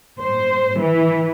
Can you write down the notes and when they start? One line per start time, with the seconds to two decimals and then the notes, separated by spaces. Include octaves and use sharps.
0.19 C5
0.79 E3